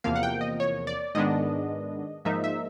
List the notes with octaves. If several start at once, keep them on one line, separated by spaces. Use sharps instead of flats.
E2 C3 F3 A#3 F5
F#5
G5
D#5
C#5
D5
G#2 D#3 G#3 B3 D4 D#5
G#2 F3 A#3 D#4 E5
E5